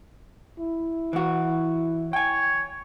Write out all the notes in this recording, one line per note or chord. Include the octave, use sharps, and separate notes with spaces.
E4
E3 F#4
C#5 G5 G#5